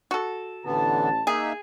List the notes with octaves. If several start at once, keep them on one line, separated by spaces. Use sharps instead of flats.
F#4 A4
A1 D3 E3 B3 A5
A#3 D#4 G#4 E5